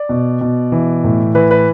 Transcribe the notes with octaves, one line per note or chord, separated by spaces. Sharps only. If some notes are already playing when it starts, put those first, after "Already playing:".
Already playing: D5
B2
B2
E3
A2
E3 B4
B4